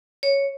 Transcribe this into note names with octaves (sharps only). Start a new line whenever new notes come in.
C#5